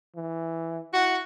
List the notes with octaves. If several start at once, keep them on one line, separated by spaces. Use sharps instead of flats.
E3
E4 F#4 F#5